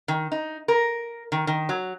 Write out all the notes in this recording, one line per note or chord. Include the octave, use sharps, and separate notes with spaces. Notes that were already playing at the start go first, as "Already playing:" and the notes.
D#3
D#4
A#4
D#3
D#3
F#3